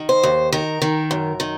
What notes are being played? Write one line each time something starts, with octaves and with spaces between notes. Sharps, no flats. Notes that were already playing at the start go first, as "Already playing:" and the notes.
Already playing: D#3
C5
D#2
D#3 A#4
D#3
F#2
D#3